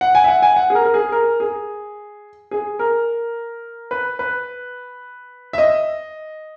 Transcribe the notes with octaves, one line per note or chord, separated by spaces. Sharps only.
F#5
G#5
E5
F#5
G#5
F#5
G#4
A#4
A#4
G#4
A#4
G#4
G#4
A#4
B4
B4
E5
D#5